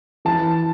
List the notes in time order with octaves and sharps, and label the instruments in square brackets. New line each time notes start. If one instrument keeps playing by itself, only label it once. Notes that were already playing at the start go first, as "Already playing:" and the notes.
[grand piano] E3 A5